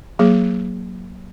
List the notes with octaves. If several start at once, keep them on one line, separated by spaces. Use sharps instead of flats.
F#3 A#3 G#4